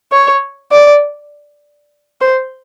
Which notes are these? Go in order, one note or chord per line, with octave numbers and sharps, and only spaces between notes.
C#5
D5
C5